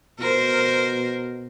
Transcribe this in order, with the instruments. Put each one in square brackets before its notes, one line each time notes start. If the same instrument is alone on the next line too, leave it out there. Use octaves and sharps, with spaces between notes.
[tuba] B2 [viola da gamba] A#4 C5